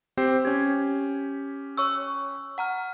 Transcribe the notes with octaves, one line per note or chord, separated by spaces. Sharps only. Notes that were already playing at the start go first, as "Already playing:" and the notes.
C4 G4 C5
C#4 G4 G#6
C#5 C#6 E6
F#5 A#5 F6